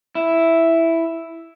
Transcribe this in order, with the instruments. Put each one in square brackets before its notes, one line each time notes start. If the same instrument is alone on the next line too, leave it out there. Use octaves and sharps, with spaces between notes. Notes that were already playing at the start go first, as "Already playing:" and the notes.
[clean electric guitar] E4